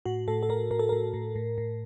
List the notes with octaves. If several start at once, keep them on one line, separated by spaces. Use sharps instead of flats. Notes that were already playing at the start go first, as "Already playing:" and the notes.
A2 F#4
A2 A4
A4
A2 A#4
A2 A#4
A4
A2 A#4
A2
A2
A2